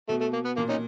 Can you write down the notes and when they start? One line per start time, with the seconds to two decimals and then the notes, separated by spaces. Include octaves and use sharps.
0.09 B2 A3
0.21 A3
0.33 A#3
0.45 B3
0.57 A#2 A#3
0.69 C#4 D#4